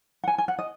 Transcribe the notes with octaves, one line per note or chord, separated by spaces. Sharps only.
F#5
G#5
G#5
F#5
D#5